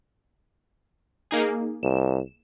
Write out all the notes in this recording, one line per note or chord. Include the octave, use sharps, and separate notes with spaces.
A#3 D#4 G#4
C2 E7